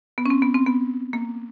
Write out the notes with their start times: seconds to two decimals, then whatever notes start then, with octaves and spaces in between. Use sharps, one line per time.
0.18 B3
0.26 C#4
0.30 C4
0.42 B3
0.54 C4
0.66 B3
1.13 A#3